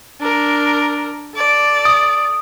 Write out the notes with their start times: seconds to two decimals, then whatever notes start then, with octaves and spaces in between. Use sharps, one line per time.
0.20 D4 A#4
1.35 A4 D5
1.85 D#6